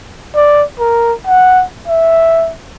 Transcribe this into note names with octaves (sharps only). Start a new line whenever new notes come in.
D5
A#4
F#5
E5